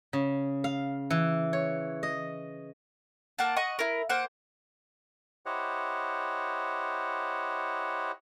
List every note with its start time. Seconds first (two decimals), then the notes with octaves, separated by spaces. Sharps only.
0.13 C#3
0.64 F5
1.10 E3
1.53 C#5
2.03 D#5
3.38 A#3 F#5 A5
3.57 D#5 F#5 C#6
3.79 E4 A#4
4.09 A#3 C5 F#5
5.46 E4 G4 C5 C#5 D#5 F#5